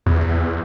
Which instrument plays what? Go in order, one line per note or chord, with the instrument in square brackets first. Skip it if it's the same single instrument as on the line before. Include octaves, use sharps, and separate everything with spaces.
[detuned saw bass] E2